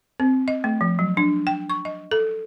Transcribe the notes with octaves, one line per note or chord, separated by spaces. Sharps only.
C4
D#5
A3
F3
F#3
D4
G5
C#6
D#5
A4